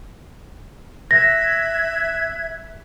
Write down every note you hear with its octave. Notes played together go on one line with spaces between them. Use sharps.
E5 F#6 G#6 A#6